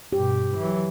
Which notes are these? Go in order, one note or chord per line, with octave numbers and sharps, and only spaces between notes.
G2 B2 G4
E3 F#3